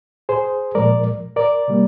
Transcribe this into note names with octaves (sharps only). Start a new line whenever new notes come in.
G#4 C5
A#2 F3 G#3 A#4 D5
A#4 D5
C3 G3 A#3